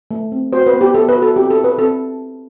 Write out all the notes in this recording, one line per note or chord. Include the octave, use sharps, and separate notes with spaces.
A3
C4
F#4 C5
B4
B3
G4
B3 A4
B4
F#4
A4
C4 G4
A4
E4
B4
C4 A4